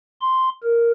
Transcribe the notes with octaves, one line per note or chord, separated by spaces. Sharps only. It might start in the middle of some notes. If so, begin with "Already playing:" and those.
C6
A#4